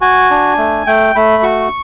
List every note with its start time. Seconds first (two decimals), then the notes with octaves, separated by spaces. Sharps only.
0.01 F#4 G#5
0.31 D4
0.58 A3
0.87 A3 G5
1.16 A3 B5
1.43 F#4 C#6